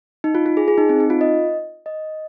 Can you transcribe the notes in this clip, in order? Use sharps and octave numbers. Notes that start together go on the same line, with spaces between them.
D#4
F4
F4
G#4
G#4
D#4
C4
D#4
F4
D#5
D#5